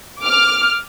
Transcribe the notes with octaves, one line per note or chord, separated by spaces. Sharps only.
D6 F6